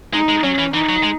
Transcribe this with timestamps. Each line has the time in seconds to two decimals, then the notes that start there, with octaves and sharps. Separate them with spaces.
0.13 G#3 D#4
0.29 G#3
0.43 F#3 C#4
0.58 E3
0.74 E3 D#4
0.89 F#3
1.03 G#3